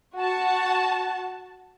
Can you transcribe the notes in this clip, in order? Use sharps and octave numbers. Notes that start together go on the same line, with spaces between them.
F#4 A5